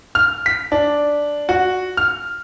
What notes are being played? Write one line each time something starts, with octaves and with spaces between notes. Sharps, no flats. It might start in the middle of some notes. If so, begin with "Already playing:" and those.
F6
B6
D4
F#4
F6